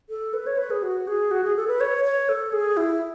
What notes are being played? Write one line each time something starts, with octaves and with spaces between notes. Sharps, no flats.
A4
B4
C#5
B4
G#4
F#4
G#4
F#4
G#4
A4
B4
C#5
C#5
A4
G#4
E4